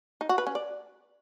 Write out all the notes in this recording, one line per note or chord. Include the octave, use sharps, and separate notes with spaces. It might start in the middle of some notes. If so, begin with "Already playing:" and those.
D#4
F#4
B4
C#4
D5